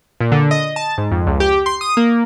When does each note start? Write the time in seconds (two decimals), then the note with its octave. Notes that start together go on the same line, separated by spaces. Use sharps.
0.21 A#2
0.32 D3
0.51 D#5
0.76 A5
0.98 G#2
1.11 F2
1.27 C#2
1.40 G4
1.66 C6
1.81 D#6
1.97 A#3